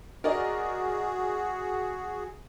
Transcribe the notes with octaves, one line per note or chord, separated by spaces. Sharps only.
F#4 G#4 A#4 D5 D#5